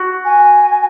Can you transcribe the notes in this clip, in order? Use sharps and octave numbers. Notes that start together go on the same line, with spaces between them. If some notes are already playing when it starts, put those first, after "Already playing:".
Already playing: F#4
G#5